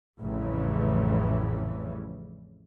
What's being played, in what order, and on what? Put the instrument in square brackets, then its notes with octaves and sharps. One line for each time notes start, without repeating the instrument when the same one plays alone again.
[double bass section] A1 F2 C#3 E3 G3